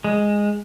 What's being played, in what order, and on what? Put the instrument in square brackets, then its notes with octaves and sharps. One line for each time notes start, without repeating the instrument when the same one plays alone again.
[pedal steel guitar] G#3